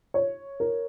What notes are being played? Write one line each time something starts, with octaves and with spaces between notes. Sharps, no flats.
C#5
A#4